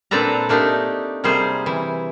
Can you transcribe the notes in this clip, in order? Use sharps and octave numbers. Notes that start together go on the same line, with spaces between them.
A#2 C4 D4 A4 B4 A#5
A3 A#3 D4 D#4 G4
C3 G3 A#3 G#4 C5
E3